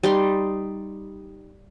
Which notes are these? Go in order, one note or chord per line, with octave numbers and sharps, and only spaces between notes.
G3 D#4 C6